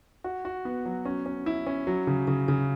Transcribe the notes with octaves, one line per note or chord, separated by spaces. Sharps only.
F#4
F#4
B3
F#3
C#4
C#4
E4
C#4
F#3
C#3
C#3
C#3